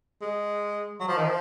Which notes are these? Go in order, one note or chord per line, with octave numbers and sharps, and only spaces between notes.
G#3
F#3
F3
D#3
F3